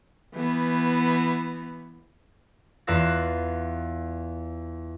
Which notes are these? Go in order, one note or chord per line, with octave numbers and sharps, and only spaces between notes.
E3 B3
E2 F4 B4 F5 E6 A#6